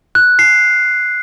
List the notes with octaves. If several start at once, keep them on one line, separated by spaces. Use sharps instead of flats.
F#6
C7